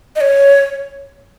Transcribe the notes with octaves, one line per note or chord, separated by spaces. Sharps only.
D#5
C#5